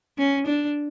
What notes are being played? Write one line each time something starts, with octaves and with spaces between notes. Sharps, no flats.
C#4
D4